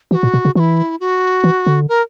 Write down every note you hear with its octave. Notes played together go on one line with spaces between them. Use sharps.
E3 G4
F#4
A#2
B2
C#3
E3 E4 F#4
F#4
E3
D3
A#4